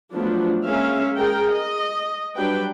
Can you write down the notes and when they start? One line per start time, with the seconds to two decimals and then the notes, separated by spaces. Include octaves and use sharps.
0.14 F3 F#3 A3 B3 D4
0.66 G#3 A#3 C#4 E5 F5
1.17 G#4 A#4 G5
1.51 D#5
2.36 F#3 G3 D4 B4 G5